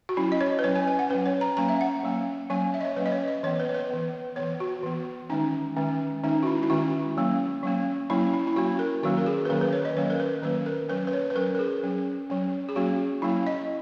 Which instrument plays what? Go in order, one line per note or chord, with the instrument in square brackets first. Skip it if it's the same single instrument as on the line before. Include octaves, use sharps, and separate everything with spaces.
[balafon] F#4
F#3 C#4 E4
D#5
C#5
B4
F#3 C#4 C#5
G#5
G#5
F#5
C#4 B4
F#3
C#5
A#5
F#3 A#3 C#4 A#5
E5
F#5
F#3 A#3 C#4
F#3 A#3 C#4 G#5
E5
D#5
C#5
F#3 A#3 C#4 B4
D#5
C#5
D#5
E3 C#5
B3
B4
C#5
B4
E3 B3
E3 B3 C#5
F#4
E3 B3
D#3 G#3 C#4 D#4
D#3 G#3 C#4
D#3 G#3 C#4 D#4
F#4
E4
E4
D#3 G#3 C#4 F#4
F#3 A#3 C#4
F#3 A#3 C#4
F#3 A#3 C#4 E4
E4
E4
F#3 A#3 C#4 F#4
A#4
D#3 F#3 A#3 C#4 F#4
A#4
G#4
B4
D#3 F#3 A#3 C#4 A#4
B4
C#5
D#5
D#3 F#3 A#3 C#4 C#5
A#4
B4
D#3 F#3 A#3 C#4 B4
A#4
F#3 C#4 B4
B4
C#5
B4
F#3 C#4 A#4
A#4
G#4
F#3 C#4
F#3 C#4
G#4
F#3 A#3 C#4 F#4
F#3 A#3 C#4 E4
D#5